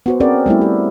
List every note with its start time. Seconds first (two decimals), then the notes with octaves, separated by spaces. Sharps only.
0.06 B3 F#4 C5
0.20 C4 C#4 G#4 A#4 D5
0.46 G3 A3 B3 E4
0.61 G4